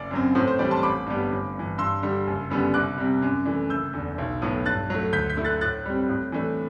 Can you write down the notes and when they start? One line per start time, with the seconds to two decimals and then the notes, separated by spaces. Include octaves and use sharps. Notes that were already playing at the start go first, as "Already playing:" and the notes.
Already playing: F#1 D5
0.11 F#2 F#3 C4
0.35 A2 C5
0.47 C5
0.59 E3 G3 D4 D5
0.71 A5 C6
0.83 A1 B5 D6
1.06 G2 D3 G3 B3
1.31 G1
1.55 G2 E3
1.78 G2 C6 E6
2.02 D3 G3 D4
2.27 F#1
2.50 F#2 D3 G3 B3
2.74 C2 D6 F#6
2.98 C3 G3
3.22 F#2
3.45 E3 A3 D4
3.69 F#1 E6 G6
3.93 E2 D3
4.18 B1
4.42 A2 F#3 B3
4.65 G2 F#6 A6
4.90 F#3 A3
5.13 D2 G6 B6
5.29 G6 B6
5.37 D3 A3 E4
5.45 F#6 A6
5.61 A2 F#6 A6
5.86 G3 C4
6.09 A2
6.32 E3 A3 D4